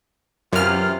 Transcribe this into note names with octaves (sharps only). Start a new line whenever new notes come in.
F#2 C3 E3 F4 F6